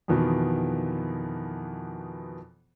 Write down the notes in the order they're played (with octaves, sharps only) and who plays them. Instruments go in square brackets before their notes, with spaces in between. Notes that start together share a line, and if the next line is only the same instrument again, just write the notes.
[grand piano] F2 B2 D#3 E3 B3